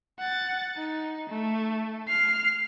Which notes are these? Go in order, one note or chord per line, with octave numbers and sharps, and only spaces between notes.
F#5 A6
D#4
A3
F6 C7